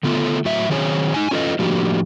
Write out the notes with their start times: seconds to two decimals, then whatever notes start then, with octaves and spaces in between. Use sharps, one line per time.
0.03 D3 A3 B3 F4 A4
0.45 A2 F#3 E5
0.69 D#3 F#3 C4 G#4 C5 C#5
1.14 D#4 G#5
1.31 C#4 F4 A4 B4 D#5
1.59 A2 F3 A#3 D4 F#4 G4